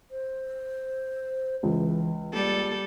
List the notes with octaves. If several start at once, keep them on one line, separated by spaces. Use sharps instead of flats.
C5
C#2 E3
G3 A#3 A4